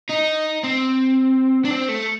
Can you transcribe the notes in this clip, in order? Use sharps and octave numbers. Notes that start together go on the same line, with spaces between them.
D#4
C4
D4
C4
A3